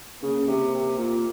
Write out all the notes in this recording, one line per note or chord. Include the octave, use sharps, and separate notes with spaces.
C#3 A#3
C3
C3
A#2